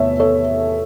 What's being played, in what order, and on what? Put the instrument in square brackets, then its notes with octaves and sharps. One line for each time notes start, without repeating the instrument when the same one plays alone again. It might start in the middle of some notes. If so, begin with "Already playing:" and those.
Already playing: [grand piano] E2 C3 A3 [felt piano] C#5 E5
[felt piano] A4 C#5